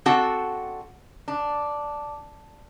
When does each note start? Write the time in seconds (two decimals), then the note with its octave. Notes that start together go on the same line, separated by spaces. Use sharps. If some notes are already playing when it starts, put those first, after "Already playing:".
0.06 C4 D4 F#4 A4 F#5
1.28 D4